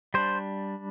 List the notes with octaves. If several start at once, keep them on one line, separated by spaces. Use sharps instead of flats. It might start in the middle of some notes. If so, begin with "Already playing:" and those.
G3 D4 C5